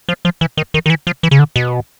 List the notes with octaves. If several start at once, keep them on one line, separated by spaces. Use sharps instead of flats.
F3
F3
E3
D#3
D#3
D#3
E3
F3
E3
C#3
D3
B2